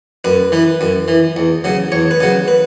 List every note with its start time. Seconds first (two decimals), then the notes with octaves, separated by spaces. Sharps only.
0.24 F#2 B4
0.52 E3 B4
0.81 F#2
1.08 E3
1.36 E2
1.64 C#3 F#3
1.92 E2 C#5
2.11 B4
2.20 C#3 F#3
2.48 B4